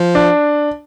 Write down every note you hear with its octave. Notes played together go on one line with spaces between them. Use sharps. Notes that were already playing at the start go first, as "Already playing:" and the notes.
Already playing: F3
D4